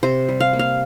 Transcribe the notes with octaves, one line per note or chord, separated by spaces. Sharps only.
C3 C5
G3
F5
A#3
F5